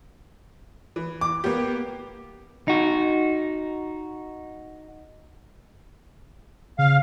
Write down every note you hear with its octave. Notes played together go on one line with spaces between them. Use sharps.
E3
D6
A#3 B3 G4
D#4 F#4
C#3 F5